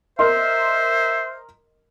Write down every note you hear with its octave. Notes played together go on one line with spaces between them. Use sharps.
A#4 C5 D#5 E5 C6